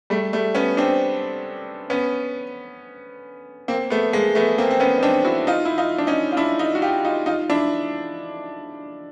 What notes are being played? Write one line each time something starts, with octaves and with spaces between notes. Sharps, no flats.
G3 A3
G3 A3
B3 C#4
C4 D4
B3 C#4
A#3 C4
A3 B3
G#3 A#3
A3 B3
A#3 C4
C4
B3 C#4
D#4
C4 D4
E4 F#4
D#4 F4
E4
D#4 F4
D4
C#4 D#4
F4
D4 E4
D#4 F4
F#4
F4 G4
D#4 F4
D#4 F4
D4 E4